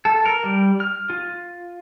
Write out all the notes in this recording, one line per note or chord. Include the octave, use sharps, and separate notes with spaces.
A4
A#4
G3
F6
F4